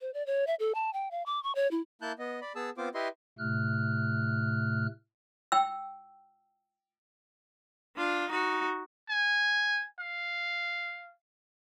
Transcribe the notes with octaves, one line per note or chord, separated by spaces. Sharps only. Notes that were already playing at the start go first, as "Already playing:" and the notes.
C5
D5
C#5
E5
A4
A5
G5
F5
D6
C#6
C#5
E4
A#3 E4 A5 F#6 G6
B3 D#5
D5 B5
B3 G#4 A5 E6
B3 C4 F4 C5 D6
E4 G4 B4 D#5 E5 C6
A2 C3 A3 F6 F#6
G5 E6
D4 F4
D#4 F#4
G#5
F5